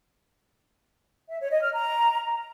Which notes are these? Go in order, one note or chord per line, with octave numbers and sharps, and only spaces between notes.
E5
C#5
D#5
F6
A#5